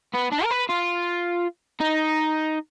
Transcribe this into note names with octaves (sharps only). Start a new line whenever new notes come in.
B3
D4
A#4
B4
F4
D#4